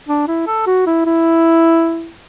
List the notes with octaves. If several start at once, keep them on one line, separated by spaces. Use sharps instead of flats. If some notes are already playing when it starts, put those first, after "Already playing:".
D4
E4
A4
F#4
E4
E4